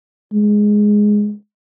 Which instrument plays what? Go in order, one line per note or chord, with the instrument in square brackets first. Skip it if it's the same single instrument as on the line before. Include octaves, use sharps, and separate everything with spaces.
[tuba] G#3